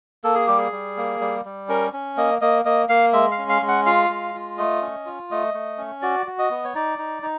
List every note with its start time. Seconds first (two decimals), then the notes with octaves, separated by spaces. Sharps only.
0.24 A#3 A4
0.35 G#4
0.47 G3 G4
0.58 G#4
0.72 G3
0.97 A#3
1.21 G3
1.45 G3
1.69 C#4 A#4
1.93 C#4
2.17 A#3 D#5
2.41 A#3 D#5
2.65 A#3 D#5
2.89 A#3 F5
3.13 G#3 E5
3.31 F5
3.38 C#4
3.49 F5
3.62 G#3
3.68 F#5
3.86 F4 F5
4.09 G#3
4.35 F4
4.58 A3 D#5
4.82 C#4
5.06 F4
5.31 A3 D#5
5.54 A3
5.78 C#4
6.02 F#4 D5
6.26 F#4
6.39 D#5
6.50 B3
6.64 C#5
6.75 D#4 D5
6.98 D#4
7.23 D#4